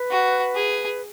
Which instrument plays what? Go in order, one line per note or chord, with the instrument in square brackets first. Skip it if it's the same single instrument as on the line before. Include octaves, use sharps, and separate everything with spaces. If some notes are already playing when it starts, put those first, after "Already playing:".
Already playing: [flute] B4
[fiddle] F#4
G#4